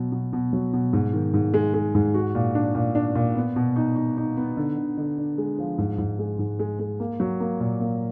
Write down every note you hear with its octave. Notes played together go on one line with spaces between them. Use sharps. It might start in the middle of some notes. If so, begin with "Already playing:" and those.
Already playing: B2 F#3
B2
B2
F#3
B2
G#2
D#3
G#2
G#3
G#3
G#2
F#4
A#2
D4
A#2
D4
A#2
B3
B2
D#4
D#4
D#4
B3
D3
D3
D3
D4
G#3
F3
G#2
G#2
G#3
G#2
G#3
G#3
A#3
F#3
A#3
A#2
A#3